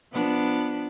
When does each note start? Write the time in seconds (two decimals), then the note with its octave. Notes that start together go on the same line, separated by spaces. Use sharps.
0.12 F3 B3 D4